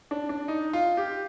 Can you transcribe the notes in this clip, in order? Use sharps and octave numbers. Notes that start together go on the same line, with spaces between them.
D4
D4
D#4
F4
G4